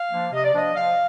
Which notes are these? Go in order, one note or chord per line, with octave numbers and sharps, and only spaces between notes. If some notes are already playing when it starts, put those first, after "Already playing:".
Already playing: F5
F3 A#3 D4
C3 D#5
D5
F3 A#3 D4 D#5
F3 F5